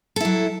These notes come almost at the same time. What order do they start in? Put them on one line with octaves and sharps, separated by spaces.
A4 E4 F#3